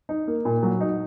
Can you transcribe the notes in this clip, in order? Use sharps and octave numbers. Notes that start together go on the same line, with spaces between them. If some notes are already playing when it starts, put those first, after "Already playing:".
D#4
A#3
A#2
F#3
D#4